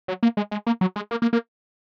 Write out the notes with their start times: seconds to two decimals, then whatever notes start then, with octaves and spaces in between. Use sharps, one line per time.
0.08 F#3
0.23 A#3
0.37 G#3
0.51 G#3
0.67 A#3
0.81 F#3
0.96 G#3
1.11 A#3
1.22 A#3
1.33 A#3